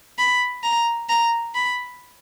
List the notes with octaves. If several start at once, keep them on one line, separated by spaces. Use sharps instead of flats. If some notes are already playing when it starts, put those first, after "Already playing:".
B5
A#5
A#5
B5